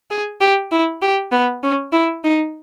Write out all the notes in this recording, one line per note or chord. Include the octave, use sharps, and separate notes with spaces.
G#4
G4
E4
G4
B3
C#4
E4
D#4